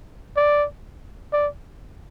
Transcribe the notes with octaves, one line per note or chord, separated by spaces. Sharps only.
D5
D5